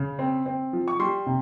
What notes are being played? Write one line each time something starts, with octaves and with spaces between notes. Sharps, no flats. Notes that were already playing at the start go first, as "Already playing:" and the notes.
Already playing: C#3
C4
C4
F3
C#6
G3 C6
C3